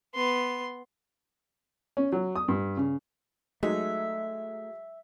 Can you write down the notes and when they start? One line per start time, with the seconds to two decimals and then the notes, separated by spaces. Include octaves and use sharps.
0.14 B3 C6
1.97 C#4
2.12 F#3
2.36 D#6
2.48 G2
2.77 C#3
3.63 F#3 G#3 A3 D#4 E5